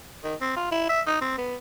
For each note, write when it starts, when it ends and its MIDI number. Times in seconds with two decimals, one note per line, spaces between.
0.24 0.35 51
0.41 0.54 60
0.56 0.68 65
0.71 0.86 64
0.89 1.01 76
1.07 1.17 63
1.21 1.37 60
1.38 1.56 59